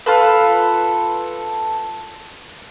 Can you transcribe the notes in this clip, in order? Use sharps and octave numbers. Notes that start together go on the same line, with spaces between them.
F4 A4 B4